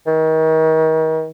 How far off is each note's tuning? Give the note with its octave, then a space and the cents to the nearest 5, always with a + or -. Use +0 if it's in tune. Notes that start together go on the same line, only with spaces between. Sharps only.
D#3 +35